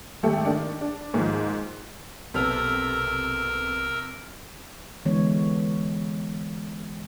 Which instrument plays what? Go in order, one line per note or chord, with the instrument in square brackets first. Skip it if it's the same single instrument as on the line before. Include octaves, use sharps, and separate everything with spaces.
[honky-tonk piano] G#1 G3 A3 A4 G5
D#3 D4
D4
G#2 D#3 F3
[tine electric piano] B1 A4 F6 [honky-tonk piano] C3 B3 [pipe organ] A#4 E6
[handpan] D3 E3 G#3 B3 C#5